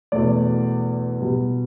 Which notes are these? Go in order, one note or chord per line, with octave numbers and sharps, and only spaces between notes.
E2 B2 A3 D5
B2 G3